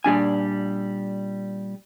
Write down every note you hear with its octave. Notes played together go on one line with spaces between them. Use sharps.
A#2 G3 D4 G#5